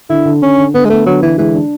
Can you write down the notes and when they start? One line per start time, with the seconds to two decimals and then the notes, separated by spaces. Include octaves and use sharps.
0.09 D3 E4
0.25 D3
0.42 D3 C#4
0.58 D3
0.74 D3 B3
0.85 G#3
0.89 A3 B3
1.06 D3 F#3
1.22 D3 E3
1.38 E3 G#3
1.55 D4